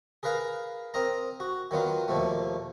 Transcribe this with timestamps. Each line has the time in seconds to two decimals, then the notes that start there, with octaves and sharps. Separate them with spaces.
0.23 G#4 A#4 B4 F5 A#5
0.94 C4 A#4 D#5 A#5
1.40 F#4
1.71 D#3 F#3 B3 F4
2.08 D#2 B2 F3 A3